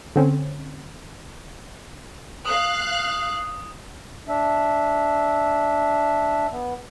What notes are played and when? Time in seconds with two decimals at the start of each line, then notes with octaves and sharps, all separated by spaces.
0.16 D3 C4 C#4
2.45 F5 D#6 F#6
4.28 D4 E5
6.52 B3